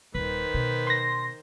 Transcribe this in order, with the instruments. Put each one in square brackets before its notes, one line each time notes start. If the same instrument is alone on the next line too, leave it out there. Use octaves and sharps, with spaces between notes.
[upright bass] D#1 [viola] D#3 C5 [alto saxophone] B4
[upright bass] B2
[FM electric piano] C6 A#6